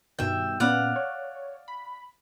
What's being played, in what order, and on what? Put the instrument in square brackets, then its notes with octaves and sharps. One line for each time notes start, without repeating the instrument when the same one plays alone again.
[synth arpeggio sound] G2 B2 D#3 [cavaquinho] E5 G5
[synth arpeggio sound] A#2 B3 C#4 [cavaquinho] D5 F5 F#5
[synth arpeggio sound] C#5
B5